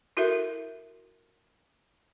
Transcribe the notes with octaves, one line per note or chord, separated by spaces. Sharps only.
E4 F#4 A4 A#4 E5